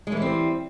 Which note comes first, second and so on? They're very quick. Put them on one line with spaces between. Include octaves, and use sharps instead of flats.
G#3 E3 G3 C4